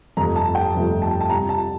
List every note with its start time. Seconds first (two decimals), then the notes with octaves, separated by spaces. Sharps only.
0.17 G1 F2 C3 F3 A3 A#5
0.36 A5
0.55 G5
0.74 G1 F2 C3 F3 A3
1.02 A5
1.21 A5
1.30 C2 C3 G3 A#5
1.49 A5